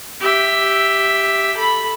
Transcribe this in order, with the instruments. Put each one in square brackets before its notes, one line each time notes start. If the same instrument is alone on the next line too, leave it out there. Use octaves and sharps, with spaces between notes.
[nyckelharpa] G4 E5
A4 B5